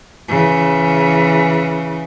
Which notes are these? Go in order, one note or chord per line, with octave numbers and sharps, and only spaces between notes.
C#3 E3